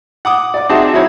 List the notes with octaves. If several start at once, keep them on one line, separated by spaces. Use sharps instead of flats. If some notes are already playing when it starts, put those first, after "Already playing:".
F#5 D6 D#6
D5 D6
C4 D#4 F#4 G#4 E5 A5
F#3 D#4 E4 C#5